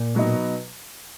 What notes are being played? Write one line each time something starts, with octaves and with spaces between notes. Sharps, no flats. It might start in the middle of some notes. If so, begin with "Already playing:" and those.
Already playing: A#2
B2 F#3 B3 D#4